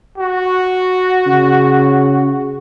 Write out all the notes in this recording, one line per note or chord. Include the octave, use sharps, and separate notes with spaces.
F#4
C#3